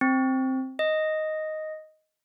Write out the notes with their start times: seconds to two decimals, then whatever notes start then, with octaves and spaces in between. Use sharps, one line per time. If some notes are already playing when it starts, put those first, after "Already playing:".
0.01 C4
0.79 D#5